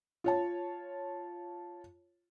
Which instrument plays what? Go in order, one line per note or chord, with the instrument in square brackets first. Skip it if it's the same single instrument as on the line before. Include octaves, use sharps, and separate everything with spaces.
[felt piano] F4 C#5 A5